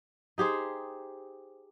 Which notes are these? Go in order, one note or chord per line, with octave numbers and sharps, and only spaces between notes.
D#4 G4 G#4 C5